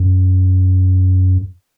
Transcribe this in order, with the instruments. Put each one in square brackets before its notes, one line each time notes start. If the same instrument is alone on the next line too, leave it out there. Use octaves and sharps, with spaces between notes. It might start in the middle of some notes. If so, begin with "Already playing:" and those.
Already playing: [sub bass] F#2